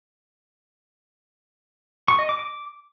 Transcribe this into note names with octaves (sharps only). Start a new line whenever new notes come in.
C#6
D#5
D6
D6